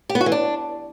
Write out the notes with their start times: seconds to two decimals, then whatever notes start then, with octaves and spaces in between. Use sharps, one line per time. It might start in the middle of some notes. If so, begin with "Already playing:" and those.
0.09 G4
0.15 B3
0.21 F#4
0.26 E3
0.32 D4